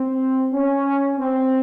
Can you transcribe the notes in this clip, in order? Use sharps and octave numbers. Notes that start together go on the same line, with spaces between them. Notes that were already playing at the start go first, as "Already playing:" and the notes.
Already playing: C4
C#4
C4